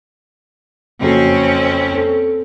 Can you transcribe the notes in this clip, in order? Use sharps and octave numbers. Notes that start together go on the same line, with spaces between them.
F#1 F2 C4 C#4 F#4
C4 A4